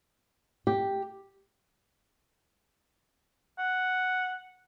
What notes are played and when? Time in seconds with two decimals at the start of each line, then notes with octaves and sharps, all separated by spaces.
0.67 G4
3.59 F#5